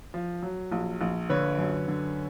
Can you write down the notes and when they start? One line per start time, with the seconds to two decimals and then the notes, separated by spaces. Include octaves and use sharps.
0.14 F3
0.42 F#3
0.72 A#1
1.01 A#1
1.30 D3 B4 C#5
1.58 F#2
1.88 D3